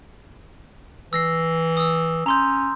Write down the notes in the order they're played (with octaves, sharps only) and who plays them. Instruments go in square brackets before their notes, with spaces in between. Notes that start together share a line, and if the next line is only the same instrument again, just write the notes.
[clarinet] E3 [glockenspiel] E6 A#6 C7
[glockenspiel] D#6 E6
[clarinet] C#4 [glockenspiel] A#5 C6 G6